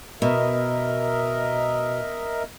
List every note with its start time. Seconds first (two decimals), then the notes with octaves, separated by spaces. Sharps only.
0.22 B2 A#4 D#5 E5